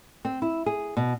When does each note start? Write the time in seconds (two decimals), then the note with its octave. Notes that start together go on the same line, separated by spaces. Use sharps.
0.25 C4
0.42 E4
0.66 G#4
0.97 B2